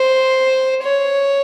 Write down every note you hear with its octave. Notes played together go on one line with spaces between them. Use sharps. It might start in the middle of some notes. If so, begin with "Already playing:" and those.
Already playing: C5
C#5